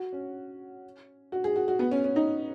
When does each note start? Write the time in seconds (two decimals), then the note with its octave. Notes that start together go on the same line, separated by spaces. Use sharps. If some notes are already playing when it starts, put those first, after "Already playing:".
Already playing: F#4
0.13 C#4
1.32 F#4
1.44 G#4
1.56 F#4
1.68 F#4
1.79 B3
1.91 C#4
2.04 C#4
2.16 D#4